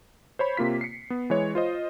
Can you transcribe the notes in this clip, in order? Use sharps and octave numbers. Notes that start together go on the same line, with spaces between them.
C5 C#5 B5
C3 A#3 F4 B6
C7 C#7
B3
E3 G#3 C#5
F4 C5 D#5